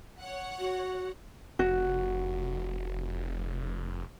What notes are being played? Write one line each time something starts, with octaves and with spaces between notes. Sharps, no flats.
C#5 F#5
F#4
F1 F#4